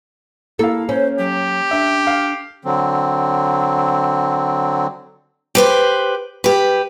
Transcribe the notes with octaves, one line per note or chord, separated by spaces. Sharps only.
A#3 E4 A4 F5
C#4 C5
F#3 G4
D4 E5
F5
D3 F#3 C4
G4 B4 C5
G4 B4